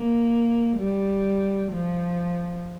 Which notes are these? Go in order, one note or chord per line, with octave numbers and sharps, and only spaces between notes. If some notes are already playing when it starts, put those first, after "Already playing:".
Already playing: A#3
G3
F3